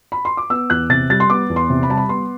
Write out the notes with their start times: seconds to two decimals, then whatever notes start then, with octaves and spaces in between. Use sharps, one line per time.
0.12 B5
0.25 C6
0.37 D6
0.50 B3 E6
0.70 E2 F#6
0.90 C3 A6
1.10 G3 A6
1.20 C6
1.29 B3 D6
1.50 E2
1.56 C6
1.70 C3
1.83 B5
1.89 G3 A5
1.97 B5
2.09 B3 C6